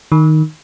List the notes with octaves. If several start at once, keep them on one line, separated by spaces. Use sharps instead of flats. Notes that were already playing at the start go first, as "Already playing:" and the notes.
D#3